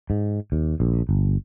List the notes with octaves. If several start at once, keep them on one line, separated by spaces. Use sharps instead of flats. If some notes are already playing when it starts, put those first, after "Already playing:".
G#2
D#2
A#1
G1